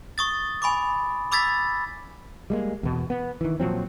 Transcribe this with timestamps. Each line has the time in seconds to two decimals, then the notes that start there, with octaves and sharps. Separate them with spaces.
0.18 C#6 D#6 A6
0.62 G#5 B5 C#6 D6
1.32 B5 D6 E6 G#6 A6 B6
2.50 G3 G#3 A#3
2.83 E2 B2
3.10 B3
3.41 D#3 E3
3.60 A#2 F3 F#3 C4